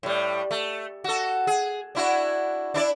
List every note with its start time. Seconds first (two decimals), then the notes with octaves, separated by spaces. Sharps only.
0.03 A2 G3
0.51 A3
1.04 F#4 A4
1.47 G#4
1.95 D4 E4 F#4
2.74 D4 E4 D5